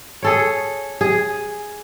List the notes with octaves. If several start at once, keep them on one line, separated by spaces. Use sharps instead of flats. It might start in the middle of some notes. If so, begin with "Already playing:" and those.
G#4 A4 C#5
G#4